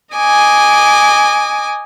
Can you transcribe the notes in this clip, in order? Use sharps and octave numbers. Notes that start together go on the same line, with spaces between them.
D#5 G#5 D6